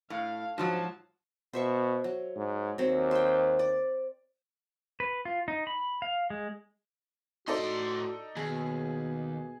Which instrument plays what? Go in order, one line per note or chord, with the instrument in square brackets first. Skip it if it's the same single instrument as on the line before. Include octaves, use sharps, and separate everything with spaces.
[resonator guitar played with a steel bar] A2 [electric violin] F5
[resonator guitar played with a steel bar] G#2 F3 F#3 [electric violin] F#4 A5
[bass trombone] B2 [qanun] C5 E5 C#6
[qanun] F#3
[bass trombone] G#2
[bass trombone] D#2 [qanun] F#3 C4
[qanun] C5 G5
D5
[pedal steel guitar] B4
F4
D#4
B5
F5
G#3
[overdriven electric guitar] A2 C6 [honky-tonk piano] D#4 A4 D5 [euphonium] F#4
[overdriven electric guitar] D#2 [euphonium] B2 [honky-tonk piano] G#4